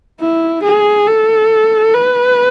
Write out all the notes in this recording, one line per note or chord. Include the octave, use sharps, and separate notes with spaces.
E4
G#4
A4
B4